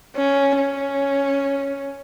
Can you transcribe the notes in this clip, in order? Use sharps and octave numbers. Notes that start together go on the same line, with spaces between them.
C#4
C#4